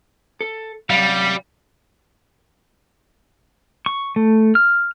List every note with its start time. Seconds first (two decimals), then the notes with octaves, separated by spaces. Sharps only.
0.41 A4
0.90 C2 F#2 G3 F5
3.86 C#6
4.16 A3
4.55 F6